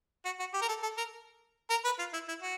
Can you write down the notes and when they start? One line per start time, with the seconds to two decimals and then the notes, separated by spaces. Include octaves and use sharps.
0.25 F#4
0.39 F#4
0.54 G4
0.62 A#4
0.69 A4
0.83 A4
0.97 A#4
1.70 A#4
1.84 B4
1.99 F4
2.13 E4
2.28 E4
2.42 F#4